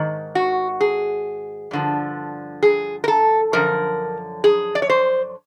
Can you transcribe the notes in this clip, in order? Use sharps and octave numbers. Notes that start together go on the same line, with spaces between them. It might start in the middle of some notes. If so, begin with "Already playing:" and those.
Already playing: G#2 D#3
F#4
G#4
G2 D3 F3
G#4
A#4
A4
F#2 D3 F3 A#4
G#4
D5
C#5
C5